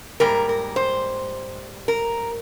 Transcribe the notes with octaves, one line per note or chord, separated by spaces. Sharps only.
G#2 G3 A#3 A#4
A#4
C5
A#4